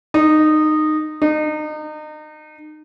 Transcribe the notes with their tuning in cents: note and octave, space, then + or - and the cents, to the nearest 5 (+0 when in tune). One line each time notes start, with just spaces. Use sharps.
D#4 -15
D#4 -30